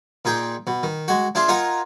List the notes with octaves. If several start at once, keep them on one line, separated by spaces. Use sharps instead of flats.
A#2 D#4 G#4 G5
B2
D#3
G#3 F#4
D4 F4 G#4 E5 C6
D#4 F4 A#4 F#5 G#5 A#5